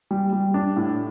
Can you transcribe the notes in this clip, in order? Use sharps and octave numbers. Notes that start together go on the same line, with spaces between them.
G3
G3
D4
A2